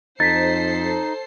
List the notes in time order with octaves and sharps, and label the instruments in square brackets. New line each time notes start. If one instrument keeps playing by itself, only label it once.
[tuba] F2 [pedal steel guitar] D#4 [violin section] A4 C5 C7 [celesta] A6 B6